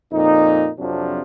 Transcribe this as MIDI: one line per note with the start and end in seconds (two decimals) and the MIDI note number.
0.12 0.69 41
0.12 0.69 46
0.12 0.69 63
0.78 1.21 41
0.78 1.21 48
0.78 1.21 53
0.78 1.21 54
0.78 1.21 62